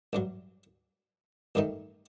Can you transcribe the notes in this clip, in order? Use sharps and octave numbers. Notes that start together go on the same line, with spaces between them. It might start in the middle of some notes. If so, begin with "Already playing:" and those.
A1 G2 F#3
A1 G2 D#3 A3 D#4